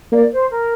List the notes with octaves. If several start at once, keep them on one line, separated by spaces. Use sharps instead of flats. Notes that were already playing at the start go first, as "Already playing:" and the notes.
A#3 D5
C5
A#4